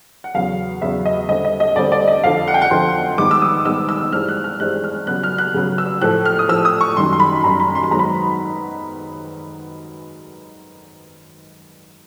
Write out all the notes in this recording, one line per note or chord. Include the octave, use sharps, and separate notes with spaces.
F#5
E2 C#3 F#3 B3 F5
E2 C#3 F#3 B3 E5
D#5
D3 G3 C4 D#5
D#5
D#5
D3 G3 C4 D5
D5
D#5
F2 D3 F3 F5
F#5
G5
F#5
F2 D3 F3 C6
G#2 D#3 G3 B3 D6
E6
D#6
G#2 D#3 G3 B3 E6
E6
G2 E3 G#3 C4 F6
F#6
F6
G2 E3 G#3 C4 F#6
F6
C#3 F#3 B3 F#6
F6
F#6
C#3 F#3 B3
E6
A2 F3 A3 F#6
F6
D#6
A2 F3 A3 E6
D#6
C#6
F#2 D#3 G3 C6
C6
B5
F#2 D#3 G3 A#5
B5
C6
B5
G#2 D#3 F#3 B3 A#5
B5